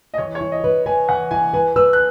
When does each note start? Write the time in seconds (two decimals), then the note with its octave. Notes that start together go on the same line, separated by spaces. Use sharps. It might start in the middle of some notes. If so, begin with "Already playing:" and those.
0.14 D#5
0.18 E3 C#5
0.35 C#5
0.41 E4
0.52 D#5
0.64 B4
0.86 B4 G#5
1.09 E3 F#5
1.31 E4 G#5
1.54 B4 G#5
1.76 B4 E6
1.93 F#6